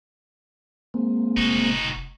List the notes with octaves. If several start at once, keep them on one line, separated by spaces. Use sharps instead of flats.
G#3 A#3 C4
F1 D#4 F#4